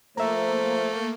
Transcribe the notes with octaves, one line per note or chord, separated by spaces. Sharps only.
F3 A3 A#3 F4 C5 E5 A#5